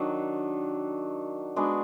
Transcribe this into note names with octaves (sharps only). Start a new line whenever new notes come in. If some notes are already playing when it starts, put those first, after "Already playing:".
Already playing: D#3 F#3 D4
G#3 B3 D4 F#4